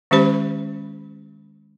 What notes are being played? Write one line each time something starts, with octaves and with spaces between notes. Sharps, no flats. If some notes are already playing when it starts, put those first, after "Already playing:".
D#3 G#3 C#4 G4 C5 B5